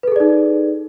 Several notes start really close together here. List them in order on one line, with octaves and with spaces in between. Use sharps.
B4 A4 G#4 D5 D#4